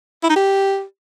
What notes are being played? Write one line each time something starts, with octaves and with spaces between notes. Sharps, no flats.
E4
D#4
G4